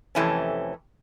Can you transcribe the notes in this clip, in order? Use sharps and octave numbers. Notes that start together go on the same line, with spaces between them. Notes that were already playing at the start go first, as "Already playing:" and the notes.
F2 C3 E3 A3 C#4